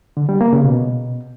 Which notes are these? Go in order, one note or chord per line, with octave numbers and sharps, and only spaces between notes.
D3
G3
A#3
C#3
B2